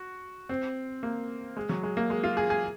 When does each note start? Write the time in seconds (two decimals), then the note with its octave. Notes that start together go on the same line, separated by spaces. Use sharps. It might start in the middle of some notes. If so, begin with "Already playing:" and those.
Already playing: F#4
0.49 C4
1.03 A#3
1.57 G#3
1.69 F#3
1.83 G#3
1.97 A#3
2.10 G#3
2.24 F4
2.37 G#4
2.50 G#4